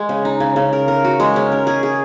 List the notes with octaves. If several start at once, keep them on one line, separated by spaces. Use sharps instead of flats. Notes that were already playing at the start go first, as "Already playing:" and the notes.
Already playing: G#3
C#3
D#4
C#3
C#3
A#4
A#4
F#4
G#3
C#4
A#4
G#4
G#4